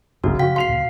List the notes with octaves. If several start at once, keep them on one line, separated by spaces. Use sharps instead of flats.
G1 C2 F#2 C#3 E3 F#4
C#3 F3 F#4 F5 G5 B6
F5 C6 C7 F7
D2 A#2 C#3